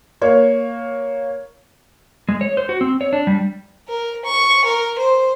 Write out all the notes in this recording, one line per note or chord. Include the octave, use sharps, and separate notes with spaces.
A#3 C#5
G#3
C#5
C5
F#4
C4
C#5
D4
G3
A#4
C#6
A#4
C5